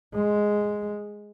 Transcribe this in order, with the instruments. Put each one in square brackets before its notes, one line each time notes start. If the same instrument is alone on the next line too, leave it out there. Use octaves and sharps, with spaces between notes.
[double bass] G#3